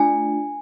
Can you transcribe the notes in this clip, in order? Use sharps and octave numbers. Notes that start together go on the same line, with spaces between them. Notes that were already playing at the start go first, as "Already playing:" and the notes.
Already playing: A3 D4 F4 G#5